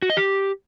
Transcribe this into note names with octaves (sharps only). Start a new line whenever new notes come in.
F#4
D#5
G4